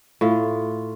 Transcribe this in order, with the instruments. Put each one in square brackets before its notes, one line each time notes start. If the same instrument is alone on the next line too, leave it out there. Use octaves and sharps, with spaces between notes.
[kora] A2 F4